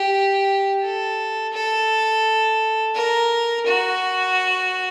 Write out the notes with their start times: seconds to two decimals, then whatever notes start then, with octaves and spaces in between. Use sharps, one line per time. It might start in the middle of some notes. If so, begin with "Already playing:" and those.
Already playing: G4
0.83 A4
1.53 A4
2.95 A#4
3.66 F#4